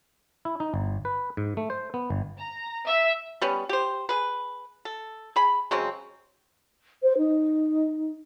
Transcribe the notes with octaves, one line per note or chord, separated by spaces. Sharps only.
E4
D#4
G1
B4
G#2
A3
C5
B3
G1
A#5
E5
G3 B3 C#4
G4 C5
G#4 B4
A4
G#4 B5
C#3 F#3 G#3 C4
C5
D#4